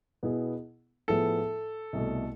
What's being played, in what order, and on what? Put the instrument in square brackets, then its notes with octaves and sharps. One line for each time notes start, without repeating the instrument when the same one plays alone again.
[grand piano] B2 B3 E4 G#4
[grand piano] A2 F3 B3 E4 G#4 [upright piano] A4
[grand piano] C2 B2 A3